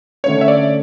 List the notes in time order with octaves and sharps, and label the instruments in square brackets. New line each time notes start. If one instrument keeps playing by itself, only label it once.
[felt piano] D3 A3 C#4 [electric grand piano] C#5
[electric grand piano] E5
D5